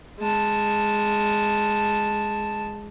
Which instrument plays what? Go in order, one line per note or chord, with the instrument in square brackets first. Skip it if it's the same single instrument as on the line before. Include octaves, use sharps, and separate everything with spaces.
[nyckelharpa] G#3 A5